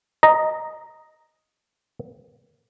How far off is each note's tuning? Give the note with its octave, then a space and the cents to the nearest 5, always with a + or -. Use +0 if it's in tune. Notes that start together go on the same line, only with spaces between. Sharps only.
D#5 +0 A#5 +0